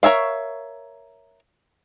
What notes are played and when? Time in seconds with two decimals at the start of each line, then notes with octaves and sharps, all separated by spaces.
0.03 A#4 C#5 E5 F5